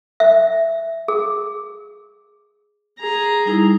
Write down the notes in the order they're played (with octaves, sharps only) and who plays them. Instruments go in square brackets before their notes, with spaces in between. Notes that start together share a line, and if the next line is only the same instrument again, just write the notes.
[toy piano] E5
G#4
[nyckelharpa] G#4 A#5
[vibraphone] G3 D#4 E4